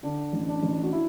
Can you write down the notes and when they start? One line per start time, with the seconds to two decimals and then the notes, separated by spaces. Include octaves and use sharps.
0.03 D3 D4
0.33 A1
0.48 D4
0.63 A1
0.83 F#4
0.92 E4